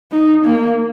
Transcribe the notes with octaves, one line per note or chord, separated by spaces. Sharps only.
D#4
A#3